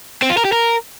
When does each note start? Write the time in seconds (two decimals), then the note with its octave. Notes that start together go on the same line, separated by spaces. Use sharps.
0.22 C4
0.30 F4
0.37 A#4
0.45 G4
0.52 A#4